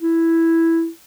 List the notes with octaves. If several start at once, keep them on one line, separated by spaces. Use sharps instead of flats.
E4